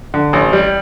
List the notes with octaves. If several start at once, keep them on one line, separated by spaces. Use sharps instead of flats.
D3
A1
G3